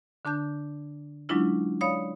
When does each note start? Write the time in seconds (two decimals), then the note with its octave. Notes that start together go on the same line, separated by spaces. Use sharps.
0.25 D3 D4 A5 G6
1.29 F#3 G#3 C#4 D4 E4 F4
1.81 C#5 D5 F5 B5 D#6